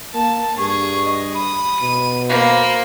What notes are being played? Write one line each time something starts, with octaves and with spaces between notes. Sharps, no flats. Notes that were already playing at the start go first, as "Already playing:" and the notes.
A#3 A5
G2 G#4 C#6
D#5
B5 D#6
B2 D#7
A#3 C5 B5